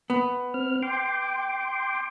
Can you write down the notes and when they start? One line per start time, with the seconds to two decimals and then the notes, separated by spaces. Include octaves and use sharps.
0.10 B3
0.54 C4 F6
0.83 G5 C6 D6